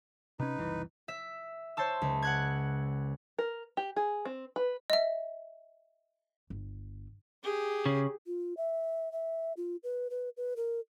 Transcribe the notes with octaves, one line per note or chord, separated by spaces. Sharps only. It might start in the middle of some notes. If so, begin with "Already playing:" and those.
C3 C#4 D#4 B4
F#1 C2 E3
E5
C5 C#5 A5 E6
C#2
F#5 F#6 G#6
A#4
G4
G#4
C4
B4
D#5 E5
G1
G4 G#4
C#3
F4
E5
E5
F4
B4
B4
B4
A#4